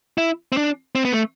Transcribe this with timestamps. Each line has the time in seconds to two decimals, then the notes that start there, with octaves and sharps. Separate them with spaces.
0.18 E4
0.52 C4
0.57 D4
0.95 C4
1.05 B3
1.13 A3